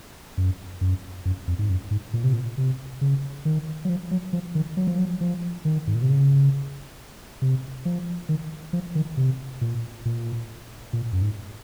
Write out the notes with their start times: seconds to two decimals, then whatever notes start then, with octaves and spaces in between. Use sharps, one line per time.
0.37 F#2
0.81 F#2
1.25 F#2
1.47 F2
1.59 G#2
1.69 F#2
1.91 G#2
2.13 A#2
2.24 C3
2.33 A#2
2.58 C3
3.01 C#3
3.45 D#3
3.85 F#3
3.89 F3
4.11 F#3
4.33 F3
4.55 D#3
4.77 F#3
4.87 F3
4.98 F#3
5.21 F3
5.65 D#3
5.87 G#2
5.95 A#2
6.02 C3
6.10 C#3
7.42 C3
7.85 F3
8.29 D#3
8.73 F3
8.95 D#3
9.17 C3
9.61 A#2
10.05 A#2
10.93 A#2
11.12 F#2
11.22 G#2